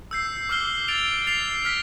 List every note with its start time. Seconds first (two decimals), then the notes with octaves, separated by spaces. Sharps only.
0.11 E6 G6 C7
0.49 D6 F6 C7 G7
0.88 A6 D7 F7
1.27 A6 C7 F7
1.65 F6 B6